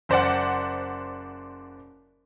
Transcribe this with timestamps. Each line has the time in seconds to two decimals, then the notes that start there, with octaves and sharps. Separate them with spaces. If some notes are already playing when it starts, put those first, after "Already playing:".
0.09 F#1 C5 D5 F#5